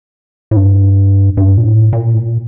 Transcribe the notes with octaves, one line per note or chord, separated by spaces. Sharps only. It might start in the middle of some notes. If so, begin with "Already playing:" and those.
A2
G2
G2
A#2
A2
A#2
A2
A#2